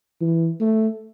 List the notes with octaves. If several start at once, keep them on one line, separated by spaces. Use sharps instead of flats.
E3
A3